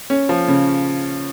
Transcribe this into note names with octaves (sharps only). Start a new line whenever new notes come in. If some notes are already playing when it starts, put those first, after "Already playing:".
C#4
F3
C#3